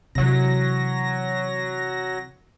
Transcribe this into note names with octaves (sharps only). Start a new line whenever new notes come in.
C3 E3 F#3 A#6